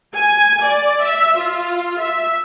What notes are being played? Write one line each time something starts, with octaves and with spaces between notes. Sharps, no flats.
G#5
D5
E5
F4
E5